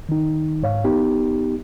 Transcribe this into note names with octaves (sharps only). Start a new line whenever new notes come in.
D#3 D#4
G#2 C#5 F5
B3 D#4 G4